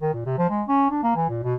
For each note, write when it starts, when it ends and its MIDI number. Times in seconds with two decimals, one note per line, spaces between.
0.01 0.13 51
0.14 0.22 46
0.26 0.34 48
0.38 0.48 53
0.49 0.63 56
0.68 0.88 61
0.90 1.03 62
1.03 1.12 58
1.16 1.27 52
1.29 1.40 46
1.43 1.55 47